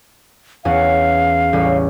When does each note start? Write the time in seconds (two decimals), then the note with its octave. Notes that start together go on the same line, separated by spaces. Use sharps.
0.65 E2 C#4 F5 F#5
1.53 A1 G3 C#4